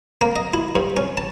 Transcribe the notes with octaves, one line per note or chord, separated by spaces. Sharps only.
A#3
D#5
E4
G2
C#4
A5